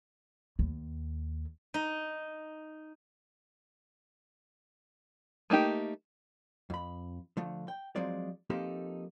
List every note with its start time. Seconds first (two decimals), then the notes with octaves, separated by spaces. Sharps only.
0.59 D#2
1.74 D#4
5.50 A3 A#3 D#4 G4 G5
6.70 F2 B5
7.37 D3 F3 A3
7.68 G5
7.96 F3 F#3 G#3 C4 D5
8.50 F3 A#3 C4 D#4 G4 A4